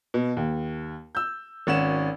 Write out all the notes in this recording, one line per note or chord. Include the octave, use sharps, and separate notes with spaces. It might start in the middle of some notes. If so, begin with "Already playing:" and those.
B2
D#2
E6 G6
G#1 C#4 F#5 E7